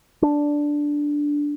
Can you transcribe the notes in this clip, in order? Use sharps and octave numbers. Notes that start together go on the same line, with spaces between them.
D4